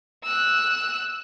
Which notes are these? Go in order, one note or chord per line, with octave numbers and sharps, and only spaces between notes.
E6 F#6